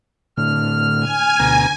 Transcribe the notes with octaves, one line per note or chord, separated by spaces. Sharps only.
A2 D3 F6
G#5
D2 B2 A#5